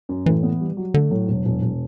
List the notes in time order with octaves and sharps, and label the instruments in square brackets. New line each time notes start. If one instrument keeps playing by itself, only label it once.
[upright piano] F#2
[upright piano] A2 [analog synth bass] E3
[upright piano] B3
G3
F#3
[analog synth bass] D3 [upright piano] A3
[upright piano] A2 [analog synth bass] F#3
[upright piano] E1
E1
E1